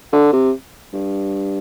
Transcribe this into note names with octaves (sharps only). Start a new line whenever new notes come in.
D3
C3
G2